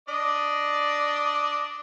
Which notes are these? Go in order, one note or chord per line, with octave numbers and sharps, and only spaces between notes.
D4 D5 D#5